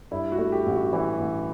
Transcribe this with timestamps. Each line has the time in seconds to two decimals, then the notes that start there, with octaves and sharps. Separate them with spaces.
0.11 G2 E4
0.32 F#4
0.38 A3
0.52 G4
0.66 A1
0.73 F#4
0.93 E3 E4
1.20 A1